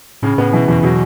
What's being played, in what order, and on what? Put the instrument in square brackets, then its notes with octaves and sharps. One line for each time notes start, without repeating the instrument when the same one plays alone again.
[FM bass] A2 [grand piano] C#3
[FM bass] A2 [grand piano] B3
[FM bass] B2 [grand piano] E3
[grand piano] E2 [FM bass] B2
[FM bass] B2 [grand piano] F#3